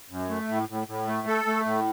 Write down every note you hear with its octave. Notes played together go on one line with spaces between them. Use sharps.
F#2
A3
A2
A2
A2
A3
A4
A3
A2